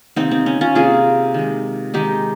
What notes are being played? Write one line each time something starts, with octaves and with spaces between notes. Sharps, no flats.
C3 D#3 A#3 C4 D#4
C4
C#4
C#4 F4
C3 D#3 A#3 F4 G#4
D#3 G#3
D#3 G#3 D#4 G4